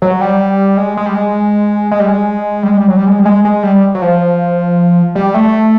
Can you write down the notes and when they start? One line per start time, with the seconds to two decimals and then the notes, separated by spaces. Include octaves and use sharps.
0.02 F#3
0.21 G3
0.77 G#3
0.97 G#3
1.06 G3
1.15 G#3
1.91 G#3
1.99 G3
2.08 G#3
2.63 G3
2.68 G#3
2.77 G3
2.88 F#3
2.97 G3
3.06 G#3
3.19 G3
3.26 G#3
3.45 G#3
3.63 G3
3.95 F#3
4.02 F3
5.15 G3
5.34 A3